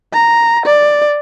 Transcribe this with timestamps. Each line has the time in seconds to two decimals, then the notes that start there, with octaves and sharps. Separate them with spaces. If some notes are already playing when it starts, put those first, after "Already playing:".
0.13 A#5
0.66 D5